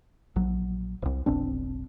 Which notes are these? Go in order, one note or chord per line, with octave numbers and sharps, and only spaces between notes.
A#1 F#3
D1 C2
F1 B1 C4 D4